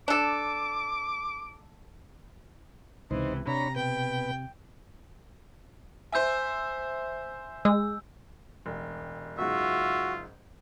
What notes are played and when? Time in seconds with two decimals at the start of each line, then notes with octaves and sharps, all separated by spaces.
0.08 D4 A4 D6
3.11 C#2 C3 E3 D#4 C5
3.47 C3 D4 C#5 A#5 B5
3.76 B2 B4 G5
6.12 C5 E5 G#5 E6 G6
7.65 G#3 E6
8.66 E1 A1
9.38 F#1 G#2 F4 F#4 E5